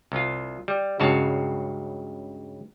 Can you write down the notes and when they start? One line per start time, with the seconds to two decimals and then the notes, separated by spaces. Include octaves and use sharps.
0.12 C2 F4
0.68 G3
1.00 C#2 G2 C#3 F#4 C#5 A5